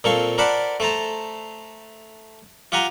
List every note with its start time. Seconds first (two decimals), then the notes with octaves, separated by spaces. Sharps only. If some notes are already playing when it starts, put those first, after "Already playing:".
0.04 A#2 C4 A4 F5 C#6
0.38 A#4 C5 D5 F#5 A5 B5
0.80 A3 C5 A5 A#5
2.72 F4 G4 F#5 G#5 A#5